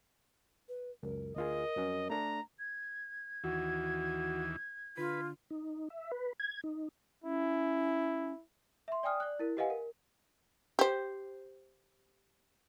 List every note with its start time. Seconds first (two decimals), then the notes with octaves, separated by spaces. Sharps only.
0.69 B4
1.03 C#2 F#2 A#4
1.36 D2 F4 G#4 A#4 D#5
1.76 F2 F#3 C#4
2.10 A3 D4 A#5
2.59 G#6
3.44 D#2 E3 F#4
4.97 D3 F4 B4
5.50 D#4
5.90 E5
6.11 B4
6.40 G#6
6.64 D#4
7.24 C#4 E4
8.88 E5 C6
9.03 D5 G5 G#5 D#6 F6
9.20 D5 F#6
9.39 E4 A#4
9.57 G4 B4 D#5 F5 F#5 G#5
9.70 A#4
10.79 G4 C5